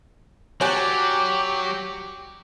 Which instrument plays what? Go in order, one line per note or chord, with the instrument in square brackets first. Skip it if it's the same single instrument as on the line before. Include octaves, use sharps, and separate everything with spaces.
[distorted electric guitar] F#3 [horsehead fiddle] G4 [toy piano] C#5 G#5 [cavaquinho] D5 F#5